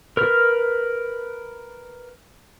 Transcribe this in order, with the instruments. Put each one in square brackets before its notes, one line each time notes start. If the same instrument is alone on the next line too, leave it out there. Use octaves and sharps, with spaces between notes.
[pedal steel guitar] A#4 B4 F6